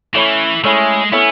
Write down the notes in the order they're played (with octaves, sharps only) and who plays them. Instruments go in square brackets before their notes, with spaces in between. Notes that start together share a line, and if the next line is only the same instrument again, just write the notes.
[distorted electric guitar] E3 [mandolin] A3 C#4 E4
[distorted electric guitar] G#3 [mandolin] A3 C#4 E4
[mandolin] A3 C#4 E4 [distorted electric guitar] B3